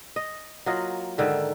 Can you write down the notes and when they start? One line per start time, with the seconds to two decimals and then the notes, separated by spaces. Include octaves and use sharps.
0.16 D#5
0.66 F#3 A#3 F4 D#5
1.18 G#2 D3 D#3 E5